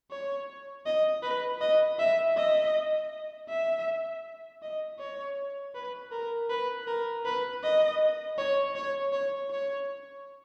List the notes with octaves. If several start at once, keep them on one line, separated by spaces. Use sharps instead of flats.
C#5
D#5
B4
D#5
E5
D#5
E5
D#5
C#5
B4
A#4
B4
A#4
B4
D#5
C#5
C#5
C#5
C#5